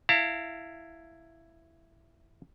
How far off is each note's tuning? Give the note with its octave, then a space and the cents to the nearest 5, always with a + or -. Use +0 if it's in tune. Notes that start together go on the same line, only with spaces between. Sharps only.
E4 +5 F5 +0 A5 +45